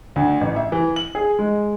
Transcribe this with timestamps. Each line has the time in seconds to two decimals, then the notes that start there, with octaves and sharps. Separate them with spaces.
0.16 D2
0.41 A1
0.56 E5
0.72 E3
0.96 F#7
1.15 G#4
1.39 G#3